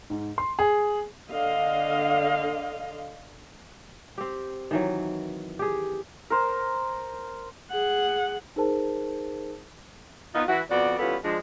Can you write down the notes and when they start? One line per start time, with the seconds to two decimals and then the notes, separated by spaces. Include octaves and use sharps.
0.10 G#2
0.38 C6
0.59 G#4
1.30 D3 D#5 F5
4.18 C4 G4
4.71 D#3 E3 F#3
5.59 G4 G#4
6.30 A#4 C5
7.71 G#4 F#5
8.56 D#4 G#4 A#4 C5 A5
10.35 B3 D#4 F4
10.48 E3 E4 F#4
10.70 F2 B3 F#4 D5
10.99 E3 G3 B3 C#4 F4 A4
11.24 F3 G#3 D4